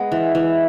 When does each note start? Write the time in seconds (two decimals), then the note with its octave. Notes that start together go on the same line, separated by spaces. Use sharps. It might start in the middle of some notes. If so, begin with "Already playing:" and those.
Already playing: G#3 B3
0.12 E3
0.35 E3